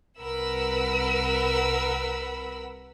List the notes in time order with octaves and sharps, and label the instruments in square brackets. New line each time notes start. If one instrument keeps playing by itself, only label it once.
[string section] C2 A#4 B4 F#5 B5 E6